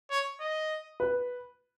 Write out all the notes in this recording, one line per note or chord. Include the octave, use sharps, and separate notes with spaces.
C#5
D#5
B4